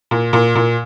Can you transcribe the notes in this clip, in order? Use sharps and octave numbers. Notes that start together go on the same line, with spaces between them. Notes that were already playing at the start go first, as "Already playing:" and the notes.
A#2
A#2
A#2